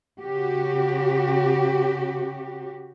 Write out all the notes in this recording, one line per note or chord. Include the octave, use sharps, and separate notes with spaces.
C#3 F#4 G4